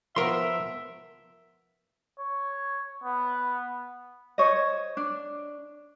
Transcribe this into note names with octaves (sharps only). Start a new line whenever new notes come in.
F3 B3 A#4 E5 C6
C#5
B3
C5 C#5 D#5
D4